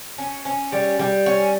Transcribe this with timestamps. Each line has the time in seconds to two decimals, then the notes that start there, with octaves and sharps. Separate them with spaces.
0.18 C#4
0.45 C#4
0.72 G3
0.99 G3
1.26 C#4